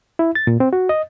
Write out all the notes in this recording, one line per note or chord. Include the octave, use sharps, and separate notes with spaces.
E4
A6
A#2
C4
F#4
D#5